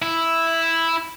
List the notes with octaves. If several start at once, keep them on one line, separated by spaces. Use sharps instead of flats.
E4